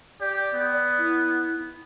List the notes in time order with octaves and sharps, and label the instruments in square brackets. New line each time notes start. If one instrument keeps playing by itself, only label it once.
[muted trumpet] G4 [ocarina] D5
[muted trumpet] B3
[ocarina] E4